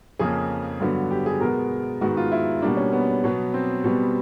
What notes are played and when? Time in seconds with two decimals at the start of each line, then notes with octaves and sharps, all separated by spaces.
0.19 F2 C#3 F3 A#3 G#4
0.80 G2 D3 F#3 B3
1.11 G4
1.26 G#4
1.41 B2 G#3 B3 A#4
2.01 G#2 D#3 G#3 B3 F#4
2.17 F4
2.32 E4
2.62 B2 G3 A#3 D4
2.77 C#4
2.92 B3
3.24 B2 F#3 B3
3.54 C4
3.84 B2 G3 B3